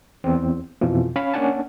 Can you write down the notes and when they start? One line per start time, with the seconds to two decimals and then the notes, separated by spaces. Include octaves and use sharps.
0.24 E2 C4
0.81 F2 B2 E3 F3
1.16 C#4 F5 B5
1.34 A#3 C#4 D4 F#5 G#5 A5